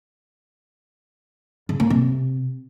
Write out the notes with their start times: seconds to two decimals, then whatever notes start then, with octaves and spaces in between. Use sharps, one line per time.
1.69 C#3
1.80 A#3
1.90 C3